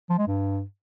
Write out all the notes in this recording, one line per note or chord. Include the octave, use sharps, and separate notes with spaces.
F3
G#3
G2